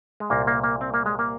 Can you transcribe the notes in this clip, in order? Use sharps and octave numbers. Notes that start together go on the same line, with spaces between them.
G#3
C2 A#2 A#3
A#3
A#3
C4
A#3
G#3
A#3